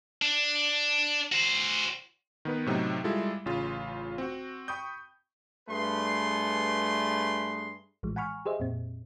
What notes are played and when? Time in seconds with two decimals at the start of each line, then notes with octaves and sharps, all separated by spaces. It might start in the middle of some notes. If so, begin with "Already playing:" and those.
0.22 D4
1.32 F#4 C5
2.45 D#3 B3 B4
2.66 A2 C3 F#3 C4 D#4
3.04 G3 G#3 E4 F4 G4 A4
3.46 A1 C#3 F4
4.18 C4 F#4
4.68 G5 B5 C#6 D#6 G6
5.69 G2 A3 G#4 B4 C6
8.03 A#1 A2 E3 F3 G#3
8.16 F#5 G#5 B5 C#6 F6
8.46 G4 G#4 C5 D#5 E5
8.60 F2 A#2 C4